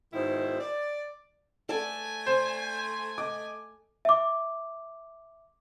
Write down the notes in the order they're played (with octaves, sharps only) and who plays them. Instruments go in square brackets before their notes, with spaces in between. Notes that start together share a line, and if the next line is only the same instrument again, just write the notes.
[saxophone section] G#2 B2 D#3 D#4 E4 C5
D5
[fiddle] A3 G#5 [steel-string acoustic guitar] A4 D5 A5
[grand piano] C5
[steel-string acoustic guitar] D#5 [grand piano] D6
[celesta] E5 D6